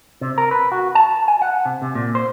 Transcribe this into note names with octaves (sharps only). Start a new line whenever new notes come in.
C3
A#4
B4
F#4
A5
G#5
F#5
C3
C3
A#2
C5